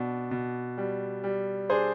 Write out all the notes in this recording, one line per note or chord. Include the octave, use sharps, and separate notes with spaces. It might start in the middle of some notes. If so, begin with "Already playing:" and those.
Already playing: B2 D4
B2
G3
G3
D4 G#4 C5